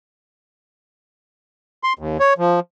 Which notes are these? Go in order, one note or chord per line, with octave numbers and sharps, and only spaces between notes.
C6
D#2
C#5
F3